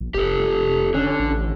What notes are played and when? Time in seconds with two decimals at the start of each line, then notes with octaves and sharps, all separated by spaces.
0.01 A#1
0.14 F1 G4 A4
0.94 D3 C#4
1.20 A1